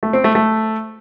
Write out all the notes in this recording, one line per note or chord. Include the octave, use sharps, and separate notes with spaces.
A3
C4
A3
A3